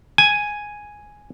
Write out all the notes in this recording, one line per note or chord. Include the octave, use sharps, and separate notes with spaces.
G#5